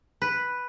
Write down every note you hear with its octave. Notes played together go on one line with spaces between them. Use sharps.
B4